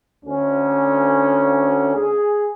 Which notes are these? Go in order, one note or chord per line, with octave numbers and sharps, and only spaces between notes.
D2 C#4
G#4